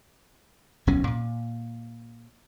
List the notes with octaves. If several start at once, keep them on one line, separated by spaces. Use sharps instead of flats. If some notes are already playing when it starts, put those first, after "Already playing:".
D1 B1 F#3 C#4
A#2